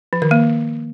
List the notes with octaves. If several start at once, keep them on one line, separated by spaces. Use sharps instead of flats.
F3
D#3
A#3